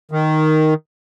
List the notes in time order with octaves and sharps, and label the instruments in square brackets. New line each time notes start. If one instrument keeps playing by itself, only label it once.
[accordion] D#3